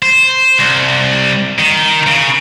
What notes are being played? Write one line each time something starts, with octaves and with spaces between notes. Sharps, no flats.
C5
C2
D#3
C#3